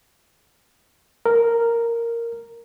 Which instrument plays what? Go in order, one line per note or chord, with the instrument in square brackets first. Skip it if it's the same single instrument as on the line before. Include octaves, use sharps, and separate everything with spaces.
[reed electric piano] A#4